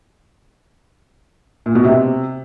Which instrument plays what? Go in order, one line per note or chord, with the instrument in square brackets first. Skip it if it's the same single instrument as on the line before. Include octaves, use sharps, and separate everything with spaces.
[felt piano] A#2
B2
C3